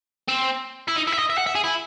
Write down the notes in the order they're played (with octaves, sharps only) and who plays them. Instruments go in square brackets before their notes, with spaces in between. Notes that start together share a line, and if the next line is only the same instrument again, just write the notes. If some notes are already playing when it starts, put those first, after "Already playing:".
[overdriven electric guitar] C4
E4
D#4
E4
E5
D#5
E5
F#5
E5
G#4
E4